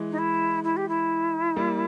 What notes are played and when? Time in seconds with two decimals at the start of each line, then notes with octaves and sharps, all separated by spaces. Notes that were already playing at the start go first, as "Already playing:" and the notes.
Already playing: E3 G#3
0.11 D#4
0.18 E4
0.64 E4
0.77 G4
0.88 E4
1.56 G3 A#3